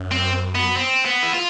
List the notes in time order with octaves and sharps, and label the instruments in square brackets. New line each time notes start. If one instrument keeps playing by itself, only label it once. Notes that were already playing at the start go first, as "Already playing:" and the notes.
Already playing: [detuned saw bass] F#2
[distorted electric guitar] C4
B3
C4
B3
E4
F4